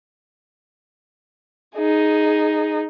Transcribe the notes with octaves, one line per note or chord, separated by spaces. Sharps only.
D#4 G#4